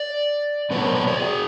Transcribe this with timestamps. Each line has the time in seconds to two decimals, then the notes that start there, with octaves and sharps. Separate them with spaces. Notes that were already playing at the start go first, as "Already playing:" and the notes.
Already playing: D5
0.70 A#2 F#3 B3 D4 B4 C#5
0.83 A#4 C5
0.95 B4 C#5
1.07 C5 D5
1.20 F#4 G#4